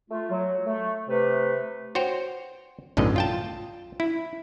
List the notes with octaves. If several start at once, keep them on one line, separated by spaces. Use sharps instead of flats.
A3 F4
F#3
A3
C3 A3 B4
F#4 C5 C#5 G5
B1 F#2 A2 D3 D#5
F4 G5 A5
E4